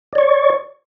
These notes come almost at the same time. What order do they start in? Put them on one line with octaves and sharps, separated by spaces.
D5 C#5 C#6